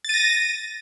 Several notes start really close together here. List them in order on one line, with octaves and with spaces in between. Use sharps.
A6 D#7 A#6